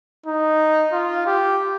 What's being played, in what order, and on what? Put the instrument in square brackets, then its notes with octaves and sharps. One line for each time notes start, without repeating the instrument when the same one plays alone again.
[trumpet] D#4
F4
G4